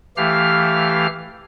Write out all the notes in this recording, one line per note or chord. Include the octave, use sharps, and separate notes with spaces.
E3 A3 G4 F5 F6